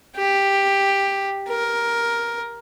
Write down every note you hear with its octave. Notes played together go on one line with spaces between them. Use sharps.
G4
A#4